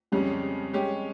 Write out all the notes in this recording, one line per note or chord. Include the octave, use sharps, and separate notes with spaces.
F2 C#3 G3 G#3 C#4
G#3 C#4 G4